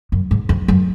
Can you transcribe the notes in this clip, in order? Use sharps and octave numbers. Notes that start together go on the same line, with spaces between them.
F#2
G#2
F2
F#2